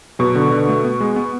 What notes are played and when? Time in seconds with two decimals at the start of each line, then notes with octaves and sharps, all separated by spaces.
0.19 B2 F#3
0.35 D3
0.52 D3
0.69 A3
0.85 B3
1.00 G#3
1.16 B3